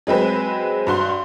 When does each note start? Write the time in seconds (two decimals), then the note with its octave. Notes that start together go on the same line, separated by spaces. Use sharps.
0.07 F#3 G#3 C4 B4
0.87 G2 F#4 C6